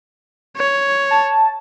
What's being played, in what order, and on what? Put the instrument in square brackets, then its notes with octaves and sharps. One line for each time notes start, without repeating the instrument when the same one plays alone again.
[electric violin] C#5
[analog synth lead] A5